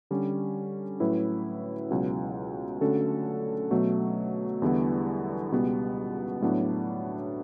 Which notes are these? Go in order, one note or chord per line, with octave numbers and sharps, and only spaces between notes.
D3 G3 C#4
A2 F#3 C#4 E4 B4
C#2 B2 F#3
D3 A3 C#4 F#4 A4
B2 F#3 A3
E2 D3 G3 B3 E4
C#2 B2 G3 B3
A2 F#3 B3 D4